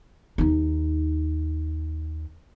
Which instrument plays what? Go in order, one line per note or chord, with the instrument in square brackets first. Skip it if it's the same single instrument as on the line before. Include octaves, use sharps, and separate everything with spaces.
[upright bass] D#2 D#4